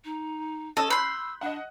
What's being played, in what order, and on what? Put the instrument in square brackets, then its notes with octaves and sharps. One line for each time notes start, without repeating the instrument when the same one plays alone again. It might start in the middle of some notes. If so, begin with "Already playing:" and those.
[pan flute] D#4
[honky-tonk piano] C#4 A5 E6 [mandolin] A4 D#5
[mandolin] B5 C6 [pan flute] E6 [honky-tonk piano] F#6 G6
[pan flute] D4 [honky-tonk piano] D#5 F#5